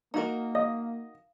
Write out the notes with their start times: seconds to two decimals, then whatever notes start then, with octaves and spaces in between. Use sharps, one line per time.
0.14 A#3 D#4 F#4 A#4 A#5 D#6
0.55 D#5 F5